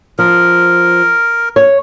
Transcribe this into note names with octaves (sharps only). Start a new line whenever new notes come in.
F3 A#4
C#5